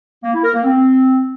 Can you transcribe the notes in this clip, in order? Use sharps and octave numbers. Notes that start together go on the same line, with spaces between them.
A#3
E4
A#4
A#3
C4